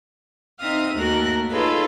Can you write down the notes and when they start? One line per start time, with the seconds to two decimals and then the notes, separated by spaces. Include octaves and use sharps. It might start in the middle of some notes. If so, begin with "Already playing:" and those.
0.61 C4 D#4 E5 F5 D#6
0.93 D#2 A3 F#4 A#4 F#6
1.51 D#4 F4 G#4 A4 B4 C#5